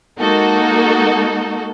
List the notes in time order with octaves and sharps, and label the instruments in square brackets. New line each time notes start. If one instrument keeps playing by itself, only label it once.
[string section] G#3 A#3 D#4 F#4 A4